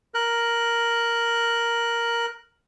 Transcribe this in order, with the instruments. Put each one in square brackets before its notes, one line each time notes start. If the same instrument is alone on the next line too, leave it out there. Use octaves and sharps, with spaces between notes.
[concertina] A#4 F#6